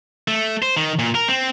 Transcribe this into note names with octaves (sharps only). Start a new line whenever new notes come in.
A3
C5
D#3
A#2
A#4
C4